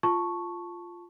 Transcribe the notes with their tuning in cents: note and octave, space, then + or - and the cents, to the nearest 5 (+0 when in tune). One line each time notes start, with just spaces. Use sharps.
F4 +0 A5 +0 C#6 +0